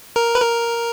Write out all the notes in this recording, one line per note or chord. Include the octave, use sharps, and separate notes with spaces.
A#4
B4
A#4